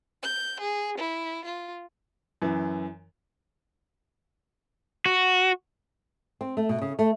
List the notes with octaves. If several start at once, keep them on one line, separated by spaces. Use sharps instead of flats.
G6
G#4
E4
F4
F#2 E3
F#4
C4
A3
B2
C#3
A3